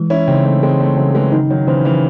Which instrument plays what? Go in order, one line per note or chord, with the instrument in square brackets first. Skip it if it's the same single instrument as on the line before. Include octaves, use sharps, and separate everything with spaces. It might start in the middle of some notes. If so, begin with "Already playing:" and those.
Already playing: [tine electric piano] E3 G#3
[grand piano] C#4 E4
[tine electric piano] C#3 [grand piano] C4 D#4
[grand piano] A3 C#4
[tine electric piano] E3 [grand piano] G#3 C4
[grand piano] A3 C#4
[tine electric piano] C#3 [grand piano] F#3 A3
[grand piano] E3 G#3
[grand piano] D#3 F#3 [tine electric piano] D#4
[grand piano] D#3 F#3
[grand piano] C#3 E3 [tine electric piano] C5
[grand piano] C#3 E3